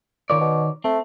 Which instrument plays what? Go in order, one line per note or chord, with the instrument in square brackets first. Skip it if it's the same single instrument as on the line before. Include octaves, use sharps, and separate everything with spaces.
[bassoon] A#2 [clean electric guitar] D#3 C#5 D5
[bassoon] B2
[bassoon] A3 [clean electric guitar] C4